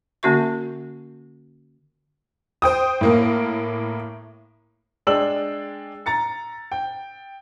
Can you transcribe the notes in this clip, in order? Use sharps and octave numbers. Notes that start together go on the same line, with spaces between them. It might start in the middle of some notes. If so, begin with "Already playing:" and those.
D3 A#3 C#4 F#4 E5 C#6
C5 G5 D#6
A2 A#3 A#4
G#3 D4 G5 E6 F#7
A#5 A6 C#7
G5